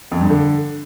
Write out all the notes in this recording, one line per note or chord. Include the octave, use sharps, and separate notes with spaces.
F2
G2
D3